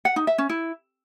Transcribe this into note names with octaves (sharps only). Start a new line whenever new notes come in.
F#5
D#4
E5
C#4
E4